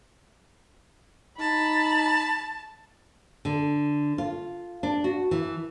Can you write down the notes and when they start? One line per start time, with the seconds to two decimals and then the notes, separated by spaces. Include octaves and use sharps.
1.40 D#4 A5 B5
3.45 D3
4.18 F4
4.83 D4
5.04 F#4
5.31 E3